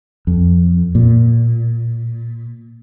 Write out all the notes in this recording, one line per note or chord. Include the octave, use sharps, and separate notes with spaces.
F2
A#2